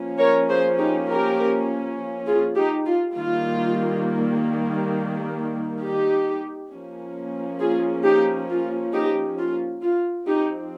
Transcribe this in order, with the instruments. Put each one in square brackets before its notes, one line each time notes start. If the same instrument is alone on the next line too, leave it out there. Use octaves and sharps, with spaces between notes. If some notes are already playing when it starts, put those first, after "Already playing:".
Already playing: [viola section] F3 A#3 C#4
A#4 C#5
G#4 C5
D#4 G4
G4 A#4
F4 G#4
D#4 G4
F4
D#3 G3 A#3 F4
D#4 G4
F3 A#3 C#4
F4 G#4
D#4 G4
F4
D#4 G4
F4
F4
F3 C4 D#4 G4